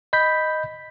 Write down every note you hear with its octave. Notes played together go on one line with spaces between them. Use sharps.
D#5 B5 G6 B6